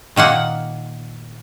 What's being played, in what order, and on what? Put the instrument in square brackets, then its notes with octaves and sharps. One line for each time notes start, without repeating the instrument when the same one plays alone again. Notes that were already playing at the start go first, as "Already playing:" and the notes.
[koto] A#2 D#3 A#3 F#5